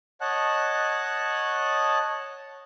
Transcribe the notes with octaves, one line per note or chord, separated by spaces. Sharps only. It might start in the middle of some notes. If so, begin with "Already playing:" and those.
C#5 D#5 F#5 A5 F#6